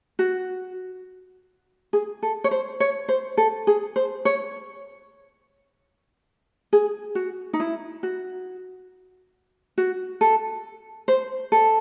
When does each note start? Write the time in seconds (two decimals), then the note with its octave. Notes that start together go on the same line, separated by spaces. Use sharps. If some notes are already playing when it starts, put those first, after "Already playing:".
0.19 F#4
1.93 G#4
2.22 A4
2.44 C#5
2.51 C5
2.80 C#5
3.08 C5
3.37 A4
3.67 G#4
3.96 C5
4.25 C#5
6.73 G#4
7.15 F#4
7.53 D#4
7.60 E4
8.03 F#4
9.78 F#4
10.21 A4
11.08 C5
11.52 A4